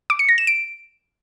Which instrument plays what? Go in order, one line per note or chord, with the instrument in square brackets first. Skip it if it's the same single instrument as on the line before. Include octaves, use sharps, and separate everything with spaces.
[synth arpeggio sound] D6
C#7
A#6
E7
D7